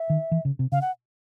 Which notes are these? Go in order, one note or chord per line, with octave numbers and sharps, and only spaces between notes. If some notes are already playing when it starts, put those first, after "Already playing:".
Already playing: E5
D#3
E3
C#3
C3
C#3 F5
F#5